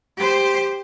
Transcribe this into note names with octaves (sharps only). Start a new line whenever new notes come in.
G4 C5